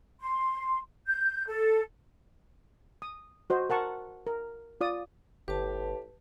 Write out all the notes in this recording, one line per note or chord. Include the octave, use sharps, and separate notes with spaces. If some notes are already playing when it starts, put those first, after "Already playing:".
C6
G6
A4
D#6
F#4 C5 D#5
A#4 F#5 A5 C#6
A#4
F4 D5 D#6
G1 A2 G4 B4 A5